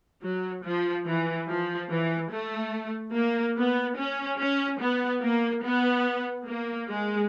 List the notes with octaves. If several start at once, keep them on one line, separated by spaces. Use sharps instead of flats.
F#3
F3
E3
F3
E3
A3
A#3
B3
C#4
C#4
B3
A#3
B3
A#3
G#3